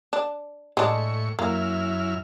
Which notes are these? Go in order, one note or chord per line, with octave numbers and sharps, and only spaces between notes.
D4
A2 G#3 D4 C#6
F#2 A#3 E4 F6